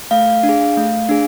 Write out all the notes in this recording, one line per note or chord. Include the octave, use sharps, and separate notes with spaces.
A3 F5
D4
G#4
A3
D4 G#4